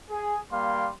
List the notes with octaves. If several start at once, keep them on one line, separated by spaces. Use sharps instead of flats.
G#4
G3 A#3 F5 C6